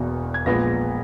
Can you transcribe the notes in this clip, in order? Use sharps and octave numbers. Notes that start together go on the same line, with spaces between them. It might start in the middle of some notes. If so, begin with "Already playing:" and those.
Already playing: E1 E2 B2 A#3
G#6
A#1 A#2 G#3 B3 A#6